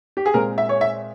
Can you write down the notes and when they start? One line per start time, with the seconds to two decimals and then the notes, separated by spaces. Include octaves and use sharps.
0.17 G4
0.26 G#4
0.34 A#2 G#3 C4 A#4
0.58 E5
0.69 C#5
0.81 E5